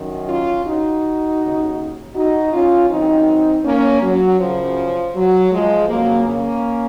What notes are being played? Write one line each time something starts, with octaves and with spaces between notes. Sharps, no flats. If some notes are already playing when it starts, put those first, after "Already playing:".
Already playing: F#2 D#3
C#4 F4
D#4 F#4
D#2 C#3
D#4 F#4
C#4 F4
F#2 D#3 C4 D#4
A#3 C#4
F#3
F#2 C#3 F3
F#3
F3 G#3
F2 C#3 F#3 A#3
A#3 C#4